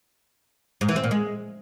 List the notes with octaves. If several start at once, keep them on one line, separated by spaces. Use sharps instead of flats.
G#2
E3
C4
A#2
G#3